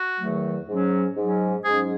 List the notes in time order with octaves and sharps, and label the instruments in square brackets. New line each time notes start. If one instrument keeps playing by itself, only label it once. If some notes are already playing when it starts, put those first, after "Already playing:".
Already playing: [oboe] F#4
[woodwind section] E2 D#3 F#3 A3
G#2 F#3 C#4
G#2 F#3 C#4
[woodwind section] G#2 F#3 C#4 [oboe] G#4